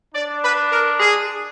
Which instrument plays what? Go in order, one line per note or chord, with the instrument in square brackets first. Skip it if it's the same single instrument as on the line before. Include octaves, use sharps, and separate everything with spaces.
[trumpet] D4 [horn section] D5
[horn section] B4
A#4
G#4